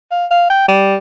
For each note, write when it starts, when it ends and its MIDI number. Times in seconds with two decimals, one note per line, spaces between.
0.11 0.26 77
0.31 0.47 77
0.50 0.68 79
0.68 0.96 55